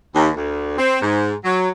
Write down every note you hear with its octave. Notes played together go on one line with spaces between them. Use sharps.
D#2
D2
C4
G#2
F#3